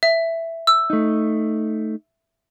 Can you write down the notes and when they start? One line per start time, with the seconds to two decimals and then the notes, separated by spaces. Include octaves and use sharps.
0.03 E5
0.67 E6
0.90 A3 D#4